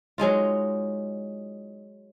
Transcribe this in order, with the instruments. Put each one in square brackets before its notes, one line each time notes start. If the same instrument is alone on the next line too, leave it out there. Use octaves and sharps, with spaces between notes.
[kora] F#3 G#3 D#4 F4